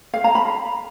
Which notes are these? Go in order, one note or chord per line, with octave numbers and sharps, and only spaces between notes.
F5
A#5
B5